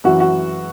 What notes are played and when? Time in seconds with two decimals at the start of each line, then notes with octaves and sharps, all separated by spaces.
0.04 F#2 E3 F#4
0.20 F#4